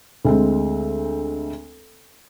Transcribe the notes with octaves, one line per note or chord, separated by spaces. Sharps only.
D2 G#3 C4